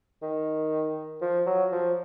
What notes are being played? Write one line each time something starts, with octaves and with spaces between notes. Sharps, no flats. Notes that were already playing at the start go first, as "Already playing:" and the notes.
D#3
F3
F#3
F3